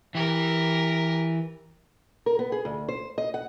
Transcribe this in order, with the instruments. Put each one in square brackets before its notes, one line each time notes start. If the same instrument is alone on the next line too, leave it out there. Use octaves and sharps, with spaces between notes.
[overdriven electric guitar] E3 [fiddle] G4 A#4
[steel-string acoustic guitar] A#4
B3
G#4
D2
C5
D#5
F#5